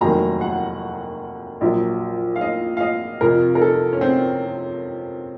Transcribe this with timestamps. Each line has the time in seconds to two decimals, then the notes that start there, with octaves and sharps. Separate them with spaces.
0.01 F1 D#2 D#3 F#3 A#5
0.41 F#5
1.61 A#1 A#2 F#3
2.36 F5
2.41 D#5
2.77 F5
2.81 D#5
3.21 F2 C3 F3 A#4
3.55 A#4
3.61 A4
3.93 C#4
4.01 C4